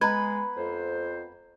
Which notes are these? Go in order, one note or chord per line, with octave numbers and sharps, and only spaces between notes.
G#3 B3 B4 A#5 G#6
F2 C5